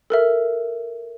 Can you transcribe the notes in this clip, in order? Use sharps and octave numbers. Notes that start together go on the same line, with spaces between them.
A4 A#4 E5